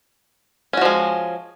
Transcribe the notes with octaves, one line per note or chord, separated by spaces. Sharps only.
F3 G#3 C#4 F#4